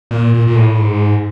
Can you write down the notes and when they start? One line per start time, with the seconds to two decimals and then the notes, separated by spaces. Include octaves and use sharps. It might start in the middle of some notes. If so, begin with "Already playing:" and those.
0.11 A#2
0.34 A#2
0.47 A#2
0.56 A2
0.79 G#2